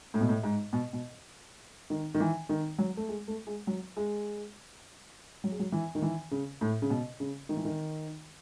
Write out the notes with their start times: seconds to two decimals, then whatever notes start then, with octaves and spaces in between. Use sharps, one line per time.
0.14 A2
0.21 B2
0.29 A2
0.44 G#2
0.73 B2
0.93 B2
1.90 D#3
2.15 D#3
2.20 E3
2.49 D#3
2.78 F#3
2.97 A3
3.09 G#3
3.28 A3
3.47 G#3
3.67 F#3
3.97 G#3
5.44 F#3
5.51 G#3
5.59 F#3
5.72 E3
5.95 D#3
6.02 E3
6.31 C#3
6.61 A2
6.82 C#3
6.90 B2
7.20 C#3
7.49 D#3
7.57 E3
7.65 D#3